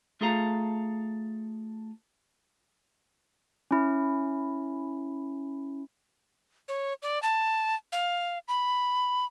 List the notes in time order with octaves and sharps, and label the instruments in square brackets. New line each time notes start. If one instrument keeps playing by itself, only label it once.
[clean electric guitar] A3 F4 G#4 A4 F5 A#5
[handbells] C#4 E4
[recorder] C#5
D5
A5
F5
B5